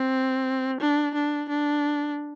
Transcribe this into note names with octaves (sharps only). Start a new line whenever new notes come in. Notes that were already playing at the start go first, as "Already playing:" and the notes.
Already playing: C4
D4
D4
D4